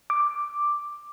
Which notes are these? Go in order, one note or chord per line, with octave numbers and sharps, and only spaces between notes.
D6